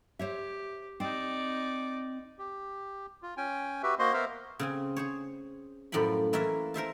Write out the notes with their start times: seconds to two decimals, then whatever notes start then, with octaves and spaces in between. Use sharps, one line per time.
0.19 G4 C5 C#5 E5
1.00 C4 D#4 D5 D#5
2.39 G4
3.22 F4
3.37 C#4 G5 G#5
3.83 F#4 G4 B4 E5
3.99 A#3 F#4 C5 D#5 C6
4.13 B3 A#4 C5 E5 F5
4.59 C#3 C4 G#5
4.96 G#4 C5 C#5
5.92 F#2 A2 F3 G5 B5
6.33 E3 A#3 C#4 F4 E5
6.74 A#4 C5 E5 A5